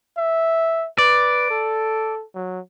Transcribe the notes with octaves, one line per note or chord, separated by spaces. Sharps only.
E5
B4 D5
A4
F#3